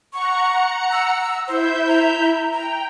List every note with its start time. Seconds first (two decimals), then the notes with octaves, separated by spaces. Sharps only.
0.13 F#5 A#5 C#6 C#7
0.92 E6
1.48 E4 C5 E5 G6
1.88 A#5
2.53 G5 A#5